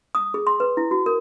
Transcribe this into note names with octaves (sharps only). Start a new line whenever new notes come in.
D#6
G#4
C6
B4
E4
F#4
A#4